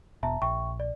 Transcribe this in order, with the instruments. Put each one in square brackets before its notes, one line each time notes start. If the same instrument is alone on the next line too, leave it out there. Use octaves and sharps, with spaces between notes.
[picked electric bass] E1 B2 [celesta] E5 A5 A#5
[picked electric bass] A#1 [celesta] E5 G5 C#6
[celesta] D5